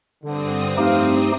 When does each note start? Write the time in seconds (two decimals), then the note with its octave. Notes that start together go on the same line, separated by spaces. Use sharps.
0.23 G2 D3 C4 D#6
0.78 F2 A3 D#4 G4 C5 F5